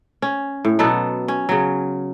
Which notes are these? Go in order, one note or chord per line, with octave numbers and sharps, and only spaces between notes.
C#4
A2
B2 F#3 B3 A4
C#4
C#3 F#3